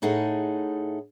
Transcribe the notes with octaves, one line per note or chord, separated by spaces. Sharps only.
A2 D#4 G#4 A4 F#5